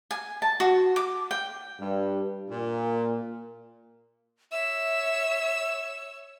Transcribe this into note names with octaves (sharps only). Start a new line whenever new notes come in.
G#5
A5
F#4
D6
G5
G2
A#2
C#5 E5 E6